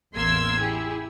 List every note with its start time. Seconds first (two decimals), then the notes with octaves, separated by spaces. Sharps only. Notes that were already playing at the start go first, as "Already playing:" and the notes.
0.14 A1 E2 A#3 C6 E6 G#6
0.60 E4 G4 G#4